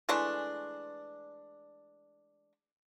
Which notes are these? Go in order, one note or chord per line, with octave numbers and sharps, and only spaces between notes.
E3 G#3 A3 D4